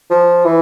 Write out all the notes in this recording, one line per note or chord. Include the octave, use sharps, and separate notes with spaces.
F3
E3